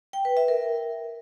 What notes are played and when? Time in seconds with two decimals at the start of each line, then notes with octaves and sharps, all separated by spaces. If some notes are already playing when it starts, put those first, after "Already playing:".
0.13 G5
0.25 B4
0.37 E5
0.48 A#4